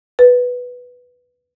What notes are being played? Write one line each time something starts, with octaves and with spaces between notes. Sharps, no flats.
B4